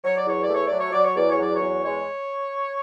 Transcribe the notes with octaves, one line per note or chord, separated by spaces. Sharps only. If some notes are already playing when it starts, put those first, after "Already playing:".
F#3 C#5
D5
E2 C#5
D5
A3 C#5
D5
F#3
C#5
F#3 D5
C#5
E2 D5
C#5
F#3 D5
C#5
E2
G#3 C#5